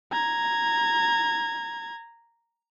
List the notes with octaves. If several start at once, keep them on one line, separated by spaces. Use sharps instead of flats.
A#5 G#6